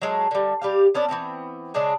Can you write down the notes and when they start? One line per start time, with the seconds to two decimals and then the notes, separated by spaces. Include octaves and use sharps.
0.02 F#3 G#3 A3
0.31 D3 G3
0.62 G3 G4 F5
0.94 B3 C#4 D4 D5
1.08 E3 G#3 B3 C4
1.74 C#3 G#3 D4 G#4